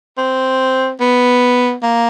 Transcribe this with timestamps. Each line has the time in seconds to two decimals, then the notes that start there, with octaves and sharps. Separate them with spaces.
0.18 C4
1.00 B3
1.83 A#3